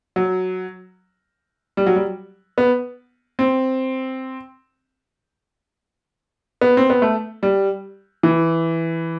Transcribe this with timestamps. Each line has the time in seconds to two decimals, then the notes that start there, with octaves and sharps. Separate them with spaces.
0.16 F#3
1.77 G3
1.86 F#3
1.96 G3
2.58 B3
3.39 C4
6.61 B3
6.77 C4
6.90 B3
7.02 A3
7.43 G3
8.23 E3